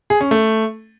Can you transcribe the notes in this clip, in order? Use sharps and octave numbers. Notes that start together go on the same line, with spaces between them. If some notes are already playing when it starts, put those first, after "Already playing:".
G#4
C#4
A3